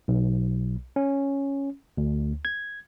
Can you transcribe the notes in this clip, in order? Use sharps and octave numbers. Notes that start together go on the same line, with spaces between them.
B1
C#4
D2
G#6